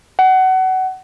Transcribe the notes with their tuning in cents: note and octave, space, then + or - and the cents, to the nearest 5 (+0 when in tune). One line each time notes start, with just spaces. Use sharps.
F#5 +25